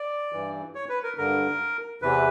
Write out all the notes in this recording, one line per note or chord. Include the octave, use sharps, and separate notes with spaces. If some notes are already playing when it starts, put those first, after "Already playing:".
Already playing: D5
G2 E3
C#5
B4
A#4
G2 D3 A#4
E2 C3 E3 B4